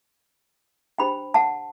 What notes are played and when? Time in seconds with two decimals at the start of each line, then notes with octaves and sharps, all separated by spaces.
0.98 D4 G4 C5 G5 B5
1.34 F#5 A5